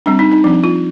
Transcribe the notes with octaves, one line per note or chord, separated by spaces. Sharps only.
G3 C4 D4
D#4
D#4
F3 C4 D4
F4